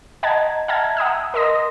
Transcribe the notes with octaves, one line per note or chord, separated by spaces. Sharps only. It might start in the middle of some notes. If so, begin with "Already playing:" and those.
D#5 F#5 A5 A#5 G#6
E5 F#5 A5 A#5 F6 G#6
F#5 A#5 D#6 E6
A#4 D#5 C6 D#6 A#6